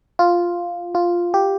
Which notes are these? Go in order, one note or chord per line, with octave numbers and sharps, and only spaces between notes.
F4
F4
G4